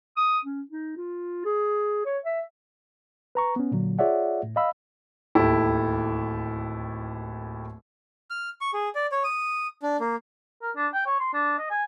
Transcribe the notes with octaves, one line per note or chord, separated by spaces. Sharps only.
D#6
C#4
D#4
F4
G#4
C#5
E5
B4 A#5 C#6
B3 C#4
A#2 D3 F#3
F4 G#4 C#5 D5 E5 F#5
A2
D#5 F5 B5 E6
D1 D#2 E4 G4 A4
F6
C#6
G#4
D5
C#5
D#6
D4
A#3
A#4
D4
G5
C#5
C6
D4
D#5
G#5